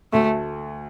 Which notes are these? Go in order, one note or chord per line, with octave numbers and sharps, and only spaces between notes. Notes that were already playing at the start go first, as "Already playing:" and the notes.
D2 A3